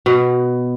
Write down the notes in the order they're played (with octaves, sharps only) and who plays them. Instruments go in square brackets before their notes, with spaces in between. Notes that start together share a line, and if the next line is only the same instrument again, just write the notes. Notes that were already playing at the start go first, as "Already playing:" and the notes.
[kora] B2